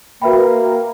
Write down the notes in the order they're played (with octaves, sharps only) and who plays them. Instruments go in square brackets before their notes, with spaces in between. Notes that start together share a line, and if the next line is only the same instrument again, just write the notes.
[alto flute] A#3 [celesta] F#4 B4 E5 G5 B5